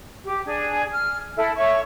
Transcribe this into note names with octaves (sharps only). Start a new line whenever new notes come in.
G4
D4 G#4
F6
E4 A4
C#5 E5 C#6